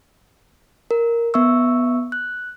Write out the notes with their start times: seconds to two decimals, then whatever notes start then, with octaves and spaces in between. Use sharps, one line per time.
0.91 A#4
1.34 B3 E5 C#6 E6
2.12 F#6